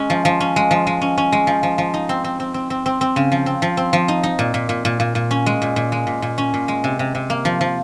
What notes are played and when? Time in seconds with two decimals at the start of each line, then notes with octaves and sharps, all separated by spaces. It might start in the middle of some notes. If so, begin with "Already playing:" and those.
Already playing: G#3 C#4
0.10 F3
0.25 F3
0.40 C#4
0.56 G#3
0.71 F3
0.87 G#3
1.01 C#4
1.18 C#4
1.32 G#3
1.47 F3
1.63 F3
1.78 F3
1.94 D#4
2.09 C4
2.24 C4
2.40 C4
2.54 C4
2.70 C4
2.86 C4
3.01 C4
3.16 C#3
3.32 F3
3.46 C4
3.62 F3
3.77 C4
3.93 F3
4.08 D#4
4.23 D#4
4.39 A#2
4.54 A#2
4.69 A#2
4.85 A#2
5.00 A#2
5.15 A#2
5.31 C#4
5.46 G#3
5.62 A#2
5.76 A#2
5.92 G#3
6.07 A#2
6.22 A#2
6.38 C#4
6.54 A#2
6.68 G#3
6.84 C3
6.99 C3
7.15 C3
7.30 A#3
7.45 F3
7.61 F3